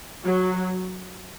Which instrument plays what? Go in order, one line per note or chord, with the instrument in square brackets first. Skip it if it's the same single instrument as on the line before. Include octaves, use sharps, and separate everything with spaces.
[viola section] F#3